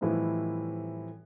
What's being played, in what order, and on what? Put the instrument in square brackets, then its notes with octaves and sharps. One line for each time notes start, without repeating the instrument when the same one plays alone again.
[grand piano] A2 E3 F3 G3 C4 D#4